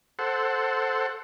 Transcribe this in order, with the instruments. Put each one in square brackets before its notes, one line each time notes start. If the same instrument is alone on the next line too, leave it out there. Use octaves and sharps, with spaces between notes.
[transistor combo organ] A4 C5 F#5